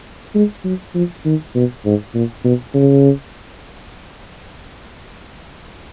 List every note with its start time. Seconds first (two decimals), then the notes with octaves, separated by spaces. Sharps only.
0.35 G#3
0.64 F#3
0.94 F3
1.25 D#3
1.55 B2
1.85 G#2
2.14 A#2
2.44 B2
2.74 C#3